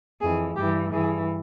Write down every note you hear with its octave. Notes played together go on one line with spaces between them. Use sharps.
F2 E3 G#4
G2 E3 G4
G2 E3 G#4